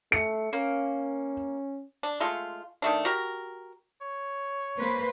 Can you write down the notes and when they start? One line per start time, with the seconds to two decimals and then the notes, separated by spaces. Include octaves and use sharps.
0.12 A3 C#7
0.53 A#3 C#4
2.03 D4
2.20 G#3 A3 F4
2.82 D#3 A3 D4
3.05 F#4 G4 A#4
4.01 C#5
4.78 A#3 B4 C5